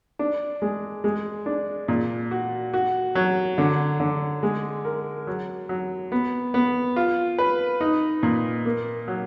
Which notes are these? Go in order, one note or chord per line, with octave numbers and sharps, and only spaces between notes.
D4
G#3
G#3
D4
A#2
F#4
F#4
F#3
D3
D3
G#3
A#4
F#3
F#3
B3
B3
F4
B4
D#4
A#2
A#3
F#3